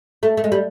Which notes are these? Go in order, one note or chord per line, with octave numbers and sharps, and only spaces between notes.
A3
A3
G#3
G3